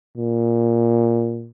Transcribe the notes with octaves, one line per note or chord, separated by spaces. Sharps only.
A#2